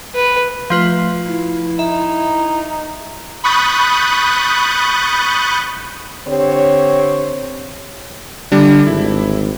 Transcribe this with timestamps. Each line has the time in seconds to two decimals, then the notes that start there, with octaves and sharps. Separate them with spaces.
0.15 B4
0.70 F3 A3 F4 B4
1.27 E4
1.79 D#4 E5
3.44 B5 C#6 D#6 F#6 G6 A6
6.28 D3 C4 G4 C#5
8.52 D3 G3 D4
8.87 G#1 E4